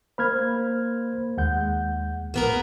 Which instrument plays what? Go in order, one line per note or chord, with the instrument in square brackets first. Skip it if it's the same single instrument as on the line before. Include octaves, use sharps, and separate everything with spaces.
[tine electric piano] A#3 C5 [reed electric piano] B5 F6 G#6
[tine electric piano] D#2 [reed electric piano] G#3 F#5 G6
[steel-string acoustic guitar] A#3 B3 A#4